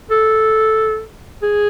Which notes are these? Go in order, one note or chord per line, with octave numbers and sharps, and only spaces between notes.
A4
G#4